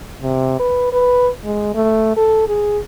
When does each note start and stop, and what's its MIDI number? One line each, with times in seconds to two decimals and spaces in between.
0.22 0.57 48
0.59 0.88 71
0.93 1.29 71
1.44 1.74 56
1.75 2.13 57
2.17 2.46 69
2.48 2.78 68